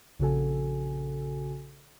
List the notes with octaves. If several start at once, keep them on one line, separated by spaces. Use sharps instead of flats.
A#1 C#3 F#4 A4 G#5